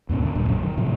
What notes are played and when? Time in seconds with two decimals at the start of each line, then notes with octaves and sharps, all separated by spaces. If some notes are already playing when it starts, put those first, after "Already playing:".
0.09 D#2 G#2 B2 C#4
0.22 D#2 D3
0.35 D#1 G2 A#2
0.48 D#1 B1 F#2 C#3
0.63 D#3
0.77 A2 C3 F3